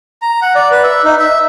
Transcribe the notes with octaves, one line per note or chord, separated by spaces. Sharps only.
A#5
F#5
D5
B4
E5
D#4
E5